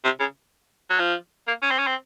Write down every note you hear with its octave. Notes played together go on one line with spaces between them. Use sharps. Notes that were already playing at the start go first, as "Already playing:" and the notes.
C3
C#3
F#3
F3
A#3
C#4
C4
C#4
C4